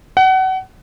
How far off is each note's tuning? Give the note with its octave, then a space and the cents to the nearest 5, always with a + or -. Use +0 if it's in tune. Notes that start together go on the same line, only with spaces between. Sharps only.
F#5 +30